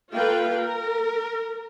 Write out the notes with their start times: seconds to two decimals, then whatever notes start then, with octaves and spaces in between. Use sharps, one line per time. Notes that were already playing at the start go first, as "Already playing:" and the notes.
0.12 A#3 F4 A4 B4 F5 G5
0.61 A#4